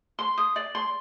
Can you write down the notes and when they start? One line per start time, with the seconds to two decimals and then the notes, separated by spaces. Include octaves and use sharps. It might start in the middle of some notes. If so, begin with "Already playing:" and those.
0.19 C6
0.38 D#6
0.56 D5
0.75 C6